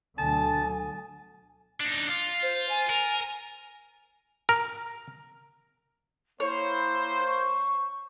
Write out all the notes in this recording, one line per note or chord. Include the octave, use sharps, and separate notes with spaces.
D2 B2 D3 F#3 A4 G#5 A5 D#6
D4 D#4
F4
C5
G#5
A#4
A#4
A#3 E4 C5 C#5
C#6